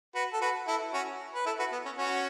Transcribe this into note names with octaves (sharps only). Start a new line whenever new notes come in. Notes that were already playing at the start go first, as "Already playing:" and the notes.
F#4 B4
A4
F#4 B4
E4 A4
C#4 F#4
B4
E4 A4
F#4 B4
B3
C#4
C#4 F#4